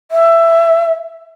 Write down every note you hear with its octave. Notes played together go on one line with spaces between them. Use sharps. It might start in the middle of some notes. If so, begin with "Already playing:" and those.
E5